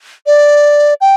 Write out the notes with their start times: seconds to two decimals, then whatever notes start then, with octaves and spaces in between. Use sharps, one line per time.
0.26 D5
1.01 G5